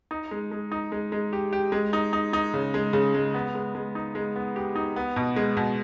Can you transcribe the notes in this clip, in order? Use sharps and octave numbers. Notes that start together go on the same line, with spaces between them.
D#4
G#3
G#3
D#4
G#3
G#3
G4
G4
G#3
D#4
D#4
D#4
C#3
G#3
C#3
G#3
B3
G#3
G#3
D#4
G#3
B3
G4
D#4
B3
B2
G#3
B2